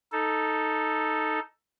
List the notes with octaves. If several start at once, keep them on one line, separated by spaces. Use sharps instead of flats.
D#4 A4